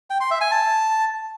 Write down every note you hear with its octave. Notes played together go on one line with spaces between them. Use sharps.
G5
C6
E5
G#5
A5